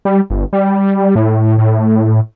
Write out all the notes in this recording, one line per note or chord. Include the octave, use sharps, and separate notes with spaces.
G3
G1
G3
A2
A2